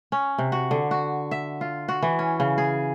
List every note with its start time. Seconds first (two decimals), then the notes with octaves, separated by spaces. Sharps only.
0.12 C#4
0.38 C3
0.52 F#4
0.71 D3
0.91 F#4
1.31 E5
1.61 F4
1.88 F#4
2.02 E3
2.19 C#4
2.40 C#3
2.58 G#4